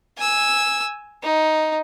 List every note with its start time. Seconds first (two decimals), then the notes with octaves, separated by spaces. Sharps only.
0.18 G#5 E6
1.23 D#4